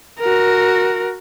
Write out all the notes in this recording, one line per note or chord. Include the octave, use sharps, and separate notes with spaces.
F#4 A#4